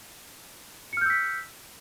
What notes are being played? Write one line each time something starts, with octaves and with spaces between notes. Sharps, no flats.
E6 F6 G6 B6 C#7